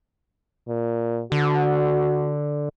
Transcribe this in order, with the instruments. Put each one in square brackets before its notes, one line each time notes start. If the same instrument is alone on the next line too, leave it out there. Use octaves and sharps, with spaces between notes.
[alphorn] A#2
[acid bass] D3 [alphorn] F#4